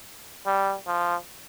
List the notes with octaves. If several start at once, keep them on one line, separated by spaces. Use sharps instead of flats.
G3
F3